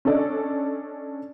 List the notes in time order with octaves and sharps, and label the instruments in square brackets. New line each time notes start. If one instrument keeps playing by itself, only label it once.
[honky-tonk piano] C#4 D4 A4 D5 D#5